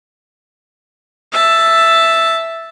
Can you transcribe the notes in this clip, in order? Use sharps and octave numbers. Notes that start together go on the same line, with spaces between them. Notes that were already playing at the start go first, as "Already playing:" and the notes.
E5 A5